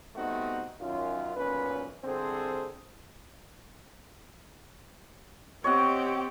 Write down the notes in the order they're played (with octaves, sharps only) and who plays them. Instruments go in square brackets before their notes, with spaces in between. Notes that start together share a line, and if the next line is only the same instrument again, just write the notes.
[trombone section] G3 A3 B3 C4 D#4 F#4
F#2 D#3 C#4 F4
B1 A#2 C#4 B4
C2 D3 C4 G#4 A4 C5
[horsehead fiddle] C4 G4 [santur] C#5 D#5 F#5